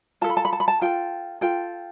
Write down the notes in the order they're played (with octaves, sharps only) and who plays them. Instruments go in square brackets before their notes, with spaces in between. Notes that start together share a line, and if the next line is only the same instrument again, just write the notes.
[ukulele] F4 A4 A5
B5
A5
B5
A5
B5
A5
F4 A4 G5
F4 A4 G5